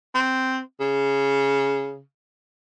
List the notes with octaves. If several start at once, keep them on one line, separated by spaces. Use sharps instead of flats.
C4
C#3